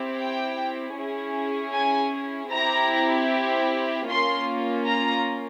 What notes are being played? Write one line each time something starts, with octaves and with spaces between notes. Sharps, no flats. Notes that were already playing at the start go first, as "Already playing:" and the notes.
Already playing: C4 E4 G4
G5
C#4 E4 G#4
G#5
C4 E4 G4 A#5
A#3 C#4 F4 C6
A#5